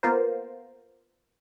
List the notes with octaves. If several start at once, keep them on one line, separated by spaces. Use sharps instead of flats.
A#3 B3 F4 A#4 C5